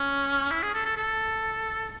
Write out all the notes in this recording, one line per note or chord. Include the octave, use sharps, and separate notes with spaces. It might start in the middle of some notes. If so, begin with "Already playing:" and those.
Already playing: C#4
E4
G#4
A4
A4
A4